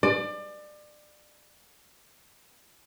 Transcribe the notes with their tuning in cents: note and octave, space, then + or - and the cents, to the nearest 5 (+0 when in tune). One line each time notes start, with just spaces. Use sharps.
D5 +30